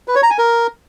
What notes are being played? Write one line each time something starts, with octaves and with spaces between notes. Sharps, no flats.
B4
C#5
A#5
G#5
A#4